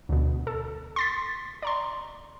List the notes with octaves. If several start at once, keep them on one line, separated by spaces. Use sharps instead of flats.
D2 B2
A4
C6 A6 B6
D5 A#5 C6